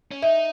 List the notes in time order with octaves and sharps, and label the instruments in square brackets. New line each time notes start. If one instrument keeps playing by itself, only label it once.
[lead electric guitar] C#4
[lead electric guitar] D#4 [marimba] E5